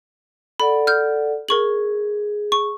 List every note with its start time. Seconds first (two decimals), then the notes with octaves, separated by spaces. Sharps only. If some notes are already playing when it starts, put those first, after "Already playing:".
0.60 A4 D5 F#5 B5
0.87 F6 G6
1.49 G#4 A#4 C#6 F#7
2.52 C#6